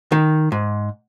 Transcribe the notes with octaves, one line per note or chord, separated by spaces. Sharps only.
D#3
G#2